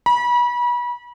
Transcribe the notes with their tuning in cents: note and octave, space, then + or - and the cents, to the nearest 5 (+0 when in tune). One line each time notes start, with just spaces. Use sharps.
B5 -35